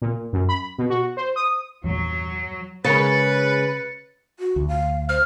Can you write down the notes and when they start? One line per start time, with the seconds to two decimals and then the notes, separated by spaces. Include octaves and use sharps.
0.02 A#2
0.33 F#2
0.49 B5
0.78 B2
0.90 F#4
1.17 C5
1.36 D#6
1.84 E2 G2 A#2 F#3
2.84 C#3 G#3 C#4 A#4 B4 A6 C#7
4.39 F#4
4.56 D2
4.68 F5
5.09 C5 F6